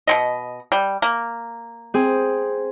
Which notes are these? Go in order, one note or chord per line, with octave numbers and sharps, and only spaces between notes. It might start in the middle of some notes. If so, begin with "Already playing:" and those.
B2 B3 D#5
G3
A#3
C4 G#4